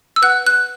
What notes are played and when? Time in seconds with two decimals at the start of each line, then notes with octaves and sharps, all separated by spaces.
0.16 E6
0.22 B4 F#5 F#6
0.47 F#6